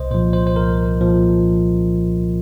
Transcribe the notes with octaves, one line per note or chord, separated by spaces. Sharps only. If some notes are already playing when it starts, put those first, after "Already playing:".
Already playing: C2 C5 D#5
A#2 F3 C5
C5
C5
C2 A#4
A#2 F3